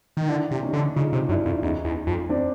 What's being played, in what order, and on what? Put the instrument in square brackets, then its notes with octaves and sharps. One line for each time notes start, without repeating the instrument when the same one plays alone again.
[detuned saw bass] D#3
[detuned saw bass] D3 [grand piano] D4 E4
[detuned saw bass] C3
[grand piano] D4
C#4 D#4
[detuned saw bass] D3
[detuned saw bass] C#3 [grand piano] D#4 F4
[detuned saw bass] C3
[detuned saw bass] F#2 [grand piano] D4 E4
[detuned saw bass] F2
[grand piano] D4
[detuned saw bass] E2 [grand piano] C#4 D#4
[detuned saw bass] E2
F2
[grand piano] C4 D4